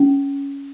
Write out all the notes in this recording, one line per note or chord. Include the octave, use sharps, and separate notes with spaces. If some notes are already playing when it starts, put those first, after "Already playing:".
Already playing: C#4